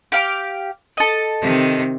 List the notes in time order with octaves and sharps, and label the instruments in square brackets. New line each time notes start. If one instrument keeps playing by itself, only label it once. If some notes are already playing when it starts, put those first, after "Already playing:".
[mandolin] G4 F5 D6
A4 D#5
[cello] C3 D#3